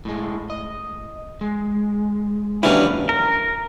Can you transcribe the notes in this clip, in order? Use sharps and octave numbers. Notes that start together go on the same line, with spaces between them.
A2 G#3
D#5
G#3
D#2 E3 F#3 C#4 D4 E4
A#4